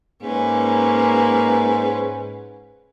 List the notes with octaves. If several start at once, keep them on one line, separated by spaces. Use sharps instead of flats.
G#2 A#3 C#4 B4